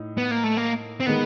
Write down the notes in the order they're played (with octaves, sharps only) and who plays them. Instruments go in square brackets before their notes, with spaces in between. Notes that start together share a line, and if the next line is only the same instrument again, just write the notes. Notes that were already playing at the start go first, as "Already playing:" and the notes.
Already playing: [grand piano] A2 D#4
[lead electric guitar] B3
A#3
A3
A#3
C4
[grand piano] D#3 G#3 [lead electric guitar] B3